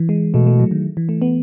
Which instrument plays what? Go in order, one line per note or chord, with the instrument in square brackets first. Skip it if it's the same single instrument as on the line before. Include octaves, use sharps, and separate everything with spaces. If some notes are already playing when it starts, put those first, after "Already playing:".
Already playing: [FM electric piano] E3
G#3
[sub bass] B2 [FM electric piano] A3
[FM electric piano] A3
F#3
D#3
E3
A3
B3